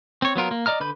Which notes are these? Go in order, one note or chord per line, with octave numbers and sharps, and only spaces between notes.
C4 C#5
F#3 B3 F4 A#4
A#3
D5 D#5 A#5 F6
D3 B4 B5 G6